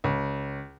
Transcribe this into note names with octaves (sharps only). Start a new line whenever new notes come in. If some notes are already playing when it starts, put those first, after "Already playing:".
C#2